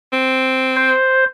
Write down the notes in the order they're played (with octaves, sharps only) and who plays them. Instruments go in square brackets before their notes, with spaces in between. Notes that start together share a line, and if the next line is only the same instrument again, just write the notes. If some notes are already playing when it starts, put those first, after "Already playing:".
[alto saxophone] C4
[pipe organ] C5